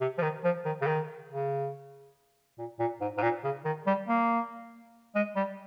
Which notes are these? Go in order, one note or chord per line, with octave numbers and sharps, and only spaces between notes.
C3
F3
D#3
F3
D#3
C#3
D#3
C#3
A#2
A#2
G#2
G#2
A#2
C#3
D#3
G3
A#3
G#3
G3